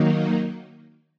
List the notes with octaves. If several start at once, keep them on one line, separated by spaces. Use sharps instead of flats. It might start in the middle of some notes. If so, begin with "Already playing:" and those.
Already playing: D#3 F#3 A#3 D#4